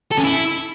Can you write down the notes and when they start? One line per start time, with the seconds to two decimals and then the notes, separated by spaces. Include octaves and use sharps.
0.11 A4
0.17 C#4
0.24 E4